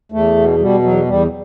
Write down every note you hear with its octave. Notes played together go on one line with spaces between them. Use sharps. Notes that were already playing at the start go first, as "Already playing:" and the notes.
E2 A3
B2
B2 G3
E2 F#3
E2 G3